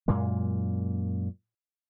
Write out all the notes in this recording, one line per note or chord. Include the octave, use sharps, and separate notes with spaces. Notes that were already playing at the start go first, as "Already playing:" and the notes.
F#2 A#2 G#3 A#3